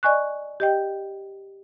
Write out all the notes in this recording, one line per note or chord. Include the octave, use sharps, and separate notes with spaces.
D5 D#5 G#5 C#6 F#6
G4 D#5 G5